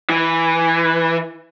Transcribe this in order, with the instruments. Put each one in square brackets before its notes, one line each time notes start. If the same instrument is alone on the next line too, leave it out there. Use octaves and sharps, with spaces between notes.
[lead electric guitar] E3